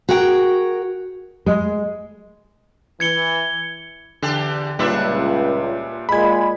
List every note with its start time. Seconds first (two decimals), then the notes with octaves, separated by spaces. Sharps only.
0.09 F#4 G#4 A#4 G5
1.46 G#3
3.00 E3 G#6 C#7 G7
4.22 E2 D3 D4 G4
4.79 C#2 A#2 G3 D4 B4 E5
6.09 A#2 G#3 B5 G#6